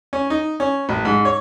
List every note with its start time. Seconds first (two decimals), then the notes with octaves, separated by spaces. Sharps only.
0.13 C#4
0.30 D#4
0.60 C#4
0.89 A1
1.05 G#2
1.25 C#5